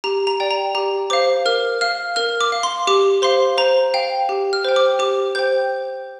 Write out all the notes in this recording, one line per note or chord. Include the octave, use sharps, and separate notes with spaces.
G4 A#5
A#5
D5 G5
A#5
G4 A#5
C5 F5 D6
A#4 F6
F5 F6
A#4 F6
D6
F5
C6
G4 D6
C5 F5 C6
C5 A#5
F5 G5
G4
F6
C5 G5
D6
G4 D6
C5 G5 G6